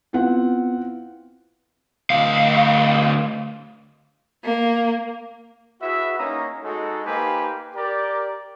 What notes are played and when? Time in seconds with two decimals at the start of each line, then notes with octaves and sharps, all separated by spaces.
0.13 B3 C4 E4 F4 F#5
2.10 D2 F5
4.44 A#3
5.81 E4 F#4 G#4 B4 E5
6.19 A#3 C#4 D#4 C#5 A#5 D#6
6.63 G#3 D#4 F#4 A4
7.05 A#3 D#4 G4 B4 C5 G#5
7.75 G4 A#4 D5